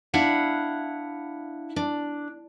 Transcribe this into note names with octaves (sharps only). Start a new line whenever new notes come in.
D4 E4 F5 F#5
D4